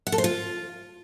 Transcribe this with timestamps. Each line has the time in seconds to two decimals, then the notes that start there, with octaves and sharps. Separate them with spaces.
0.07 F#5
0.12 A4
0.18 C5
0.24 F4